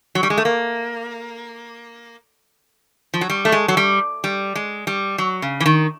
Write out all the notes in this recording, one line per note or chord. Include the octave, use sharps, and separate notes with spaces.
F#3
G3
G#3
A3
A#3
F3
F#3
G3
A3
G#3
F#3
G3
G3
G#3
G3
F#3
C#3
E3
D#3